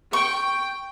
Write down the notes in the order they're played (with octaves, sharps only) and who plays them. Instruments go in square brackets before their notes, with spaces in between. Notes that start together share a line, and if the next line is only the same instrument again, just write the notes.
[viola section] G5 [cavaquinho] C#6